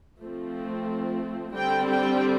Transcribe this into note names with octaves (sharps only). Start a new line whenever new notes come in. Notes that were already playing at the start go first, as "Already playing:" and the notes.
F3 A3 C4
D3 G3 C4 G5
G5